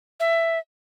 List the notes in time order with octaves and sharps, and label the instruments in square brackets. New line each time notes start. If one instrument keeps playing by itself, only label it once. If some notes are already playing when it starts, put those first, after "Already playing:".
[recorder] E5